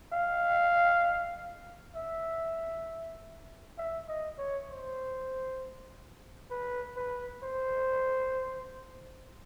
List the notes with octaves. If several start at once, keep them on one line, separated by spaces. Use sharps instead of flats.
F5
E5
E5
D#5
C#5
C5
B4
B4
C5